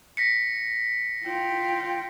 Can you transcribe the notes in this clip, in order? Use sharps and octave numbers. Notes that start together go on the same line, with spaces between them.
A#6 B6 C#7
F4 G5